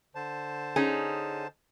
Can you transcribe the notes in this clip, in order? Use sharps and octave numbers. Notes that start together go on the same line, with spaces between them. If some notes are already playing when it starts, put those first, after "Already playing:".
D3 C5 A5
C#4 D#4 G#4